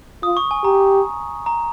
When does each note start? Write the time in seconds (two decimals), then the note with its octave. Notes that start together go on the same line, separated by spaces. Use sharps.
0.23 F4 D#6
0.37 C#6
0.51 G#5
0.64 G4 A#5
1.46 A#5